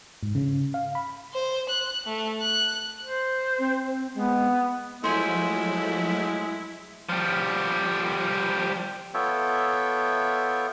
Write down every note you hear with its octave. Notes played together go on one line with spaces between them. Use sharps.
G#2
C#3
F5
B5
C5
F#6
A3
F#6
C5
C4
G#3 B3
F3 F#3 G#3 A3 E4 C5 G#5
F3 G3
B3 F4 A4 C#5 E5 G5